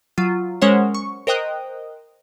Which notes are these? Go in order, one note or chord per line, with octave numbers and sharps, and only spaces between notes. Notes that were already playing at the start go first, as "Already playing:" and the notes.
F#3 F4
G#3 C#4 A#4 C5 C#5 F#5
C#6
A#4 C5 D#5 G5 D#6 F#6